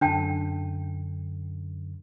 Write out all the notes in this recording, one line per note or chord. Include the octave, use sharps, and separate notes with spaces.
F#2 D3 D4 G5 A5